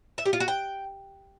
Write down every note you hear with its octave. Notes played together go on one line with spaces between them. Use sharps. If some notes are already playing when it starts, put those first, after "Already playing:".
E5
G4
F4
F#4
G5